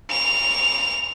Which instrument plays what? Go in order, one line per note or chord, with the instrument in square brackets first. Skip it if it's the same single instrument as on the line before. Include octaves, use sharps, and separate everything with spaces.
[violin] F7